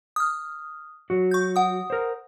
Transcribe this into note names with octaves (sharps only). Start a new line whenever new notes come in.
D#6 F6
F#3 F#4
C#6 G6
F#5 D#6
A#4 C5